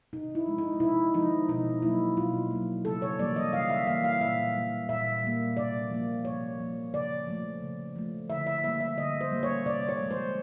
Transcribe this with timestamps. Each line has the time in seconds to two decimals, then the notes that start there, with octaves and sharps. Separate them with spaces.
0.13 C3 D#4
0.35 E4
0.46 F3 G#3
0.58 D#4
0.80 C3 E4
1.14 F3 G#3 D#4
1.49 B2 D#4
1.82 F#3 A#3 E4
2.17 B2 F4
2.51 F#3 A#3
2.85 C#3 A4
3.02 C#5
3.19 E3 G3 A#3 D5
3.36 D#5
3.53 C#3 F5
3.70 E5
3.87 E3 G3 A#3 F5
4.04 F5
4.20 A#2 E5
4.55 G3 A#3
4.89 A#2 E5
5.23 G3 A#3
5.57 C3 D5
5.91 F3 A#3
6.25 C3 C#5
6.60 F3 A#3
6.93 C#3 D5
7.27 F3 A3
7.62 C#3
7.96 F3 A3
8.29 D3 E5
8.46 E5
8.63 G3 A#3 E5
8.80 E5
8.97 D3 D#5
9.21 C5
9.31 G3 A#3
9.43 C#5
9.66 C3 D5
9.89 C#5
10.00 F3 G#3
10.11 C5